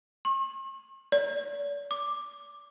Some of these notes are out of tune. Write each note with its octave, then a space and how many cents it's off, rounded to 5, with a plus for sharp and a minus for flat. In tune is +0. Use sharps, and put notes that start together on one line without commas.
C#6 -45
D5 -40
D6 +5